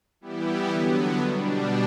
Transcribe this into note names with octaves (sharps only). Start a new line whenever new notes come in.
E3 G3 B3 E4 G4
D3 F#3 B3
B2 G3 D4